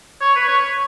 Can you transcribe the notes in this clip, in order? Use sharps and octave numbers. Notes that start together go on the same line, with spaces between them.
C#5
B4
C#5